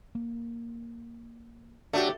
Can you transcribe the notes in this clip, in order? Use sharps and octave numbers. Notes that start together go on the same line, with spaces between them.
A#3
F#3 A3 D4 F#4 G4